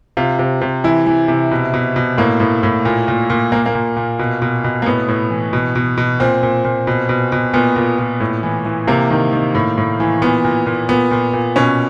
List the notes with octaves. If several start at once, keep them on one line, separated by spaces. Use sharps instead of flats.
C3 F4
C3
C3
E3 E4
E3
C3
B2
B2
B2
A2 A#3
A2
A2
A#2
A#2
A#2
A#2 A#3
A#3
A#2
A#2
B2
B2
B2
A#3
A2 B3
A2
E3
B2
B2
B2
A#2 C4
A#2
A#2
B2
B2
B2
A#2 B3
A#2
A#2
A2
E3
E3
C3 A#3
D#3
D#3
A2
A2
E3
A#2 B3
A#2
A#2
A#2 B3
A#2
A#2
B2 C#4